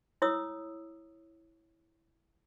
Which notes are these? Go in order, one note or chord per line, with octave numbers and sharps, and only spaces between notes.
E4 C#5 D#6 E6